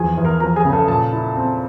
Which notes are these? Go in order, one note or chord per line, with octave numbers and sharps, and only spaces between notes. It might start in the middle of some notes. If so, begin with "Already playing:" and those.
Already playing: E2 F3 G#4 G#5
E2
A#4 A#5
F3 A#4 A#5
G#4 G#5
C#3
A4 A5
A#2 A4 A5
E4
C4